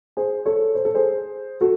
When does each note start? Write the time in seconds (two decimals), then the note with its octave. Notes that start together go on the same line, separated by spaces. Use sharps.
0.17 G#4 C5
0.46 A4 C#5
0.75 C5
0.85 A4
0.95 G#4 C5
1.61 F#4 A4